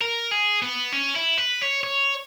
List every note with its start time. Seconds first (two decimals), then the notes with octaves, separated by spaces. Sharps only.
0.01 A#4
0.31 G#4
0.62 B3
0.92 C#4
1.15 E4
1.38 B4
1.61 C#5
1.83 C#5